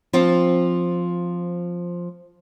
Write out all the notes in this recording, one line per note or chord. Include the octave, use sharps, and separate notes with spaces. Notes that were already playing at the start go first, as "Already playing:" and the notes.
F3 C4 F4